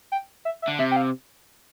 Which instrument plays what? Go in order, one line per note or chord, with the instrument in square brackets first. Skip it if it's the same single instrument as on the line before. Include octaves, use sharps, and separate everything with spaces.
[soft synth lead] G5
E5
E5
[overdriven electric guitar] D3
[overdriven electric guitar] C3 [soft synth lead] E5
[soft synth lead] G5
F5